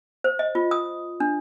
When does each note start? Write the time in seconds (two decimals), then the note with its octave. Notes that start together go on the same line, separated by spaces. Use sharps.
0.24 C5
0.39 D#5
0.55 F4
0.71 D#6
1.20 D4